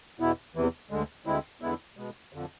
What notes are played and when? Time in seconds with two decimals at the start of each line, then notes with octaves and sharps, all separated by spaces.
0.20 E2 B2 B3 E4
0.55 E2 C3 E3
0.91 D2 D3 G#3
1.26 D2 D3 G#3 C4 E4
1.62 E2 D3 G#3 B3 E4
1.97 B2 G#3 B3
2.33 F2 D3 F3